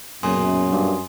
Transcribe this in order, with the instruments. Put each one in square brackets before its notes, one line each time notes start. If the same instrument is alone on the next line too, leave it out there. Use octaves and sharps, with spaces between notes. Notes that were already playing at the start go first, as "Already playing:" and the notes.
[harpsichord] B1 A#2 C#3 [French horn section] F#2 [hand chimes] G#5 C6 D#6
[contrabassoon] G2